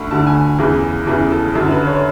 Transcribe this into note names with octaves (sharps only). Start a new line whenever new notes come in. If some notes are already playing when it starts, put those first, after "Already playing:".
Already playing: D2 D3 B5 C#6
D2 D3 A5
G#5
E2 C#3 E3 G#4
E2 C#3 E3 G#4
A4
F#2 D3 A4
A4
B4
C#5